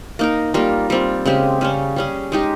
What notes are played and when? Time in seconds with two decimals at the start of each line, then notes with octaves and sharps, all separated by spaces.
0.19 A#3 D#4 A#4
0.54 G3 A#3 F4 A#4
0.90 G3 C4 F4
1.26 C#3 G#3 C4 G4
1.61 C#3 G3 C#4
1.96 G3 C#4 G#4
2.32 G#3 D#4 G4